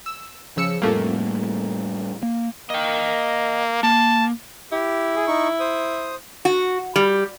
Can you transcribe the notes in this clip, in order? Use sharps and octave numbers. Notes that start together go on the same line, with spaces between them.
E6
C#3 F3 E6 C#7
F2 A2 G3 A3 A#3
A#3
A#3 D#5 G5
A#3 A5
E4 G4
G#4
D#4 C#6
C5 D#6
F#4
G3